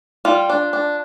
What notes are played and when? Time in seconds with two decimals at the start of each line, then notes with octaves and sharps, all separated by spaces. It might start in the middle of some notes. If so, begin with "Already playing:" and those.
0.25 G3 F4
0.50 D4
0.73 D4